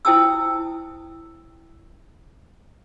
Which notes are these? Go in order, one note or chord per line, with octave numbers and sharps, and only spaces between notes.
E4 C5 G5 A5 D#6 E6